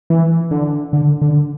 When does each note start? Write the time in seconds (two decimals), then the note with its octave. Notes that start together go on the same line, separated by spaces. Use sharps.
0.10 E3
0.51 D3
0.93 D3
1.21 D3